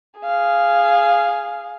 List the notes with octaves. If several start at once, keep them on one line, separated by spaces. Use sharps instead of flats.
G#4 F5